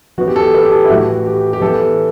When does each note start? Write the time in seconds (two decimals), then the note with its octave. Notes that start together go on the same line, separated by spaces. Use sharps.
0.18 E3 B3 F#4
0.27 G4
0.36 A4
0.54 B4
0.65 G4
0.71 A4
0.85 E4
0.90 A2 E3 A3 F#4
1.26 G4
1.53 G4
1.61 E3 B3 A4